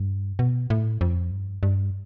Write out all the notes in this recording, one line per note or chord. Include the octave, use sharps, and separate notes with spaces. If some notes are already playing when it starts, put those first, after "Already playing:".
Already playing: G2
B2
A2
F2
G2
G2